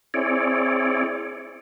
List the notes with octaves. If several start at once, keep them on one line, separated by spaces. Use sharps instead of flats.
C4 E4 G#4 C#5 D5